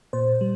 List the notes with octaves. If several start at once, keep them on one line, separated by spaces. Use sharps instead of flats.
A#2 C5
G3